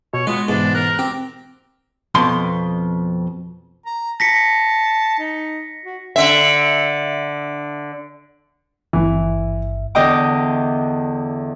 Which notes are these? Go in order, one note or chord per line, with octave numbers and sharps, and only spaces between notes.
B2 C#5
G#3 B3 F4
E2 G#2 B2 D4
A#4 F#6
C4 G4
F2 B2 C6
A#5
A5 A#6 B6 C#7
D#4
F#4
D3 E5
G#1 G2 E3 E5
E2 D3 D#5 G5 D6